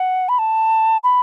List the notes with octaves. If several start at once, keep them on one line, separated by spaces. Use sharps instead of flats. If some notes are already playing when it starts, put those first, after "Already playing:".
Already playing: F#5
B5
A5
B5